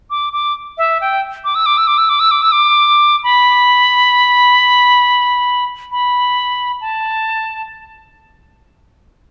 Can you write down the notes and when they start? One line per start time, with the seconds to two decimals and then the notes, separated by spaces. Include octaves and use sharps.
0.10 D6
0.33 D6
0.78 E5
1.01 G5
1.44 D6
1.55 E6
1.66 D6
1.78 E6
1.87 D6
1.98 E6
2.09 D6
2.20 E6
2.31 D6
2.42 E6
2.52 D6
3.23 B5
5.92 B5
6.81 A5